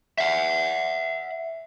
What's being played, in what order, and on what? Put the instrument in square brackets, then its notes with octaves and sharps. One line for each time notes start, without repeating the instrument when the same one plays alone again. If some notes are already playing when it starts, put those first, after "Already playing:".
[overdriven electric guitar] E5 F#5